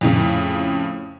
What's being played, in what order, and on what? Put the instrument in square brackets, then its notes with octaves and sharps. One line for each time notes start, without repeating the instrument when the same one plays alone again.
[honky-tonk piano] F2 A2 C#3